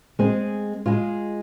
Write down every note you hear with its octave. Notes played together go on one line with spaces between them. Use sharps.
G#3 C4 G#4
G#3 F4 G#4